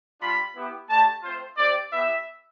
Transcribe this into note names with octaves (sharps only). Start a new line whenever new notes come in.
G3 D4 F4 B5
B3 E4 G4
A3 D4 G4 A5
A3 C4 F4 C5
C4 G4 D5
B3 E4 G4 E5